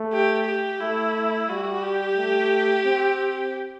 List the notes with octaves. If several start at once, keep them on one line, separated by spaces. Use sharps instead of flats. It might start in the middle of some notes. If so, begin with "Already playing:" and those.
Already playing: A3
G4
G4
A3 E4
G3 F#4
G4
A3
C4